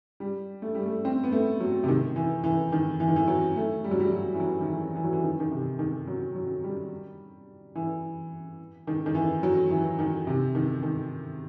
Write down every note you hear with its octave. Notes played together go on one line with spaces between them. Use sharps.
G3
A3
G3
A3
C4
B3
A3
F#3
C3
D#3
E3
E3
D#3
E3
D#3
E3
F#3
A3
G3
F#3
G3
F#3
E3
F#3
D#3
E3
E3
F#3
E3
D#3
D#3
C3
D#3
F#3
F#3
G3
E3
D#3
D#3
E3
F#3
E3
D#3
C3
D#3
D#3